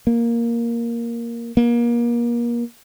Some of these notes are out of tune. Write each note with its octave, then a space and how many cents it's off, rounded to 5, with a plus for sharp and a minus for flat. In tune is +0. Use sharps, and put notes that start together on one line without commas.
A#3 +5
A#3 +30